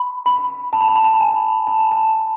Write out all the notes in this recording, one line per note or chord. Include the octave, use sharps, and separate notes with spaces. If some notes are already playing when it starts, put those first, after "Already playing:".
Already playing: B5
B5
A5
B5
A5
B5
A5
G#5
A5
B5
A5